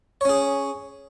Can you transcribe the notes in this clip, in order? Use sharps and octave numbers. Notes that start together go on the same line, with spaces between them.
C#4 G#4 C#5